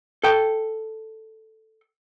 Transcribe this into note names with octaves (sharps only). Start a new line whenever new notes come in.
A4 G5